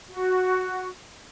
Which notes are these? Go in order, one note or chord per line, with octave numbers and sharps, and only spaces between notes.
F#4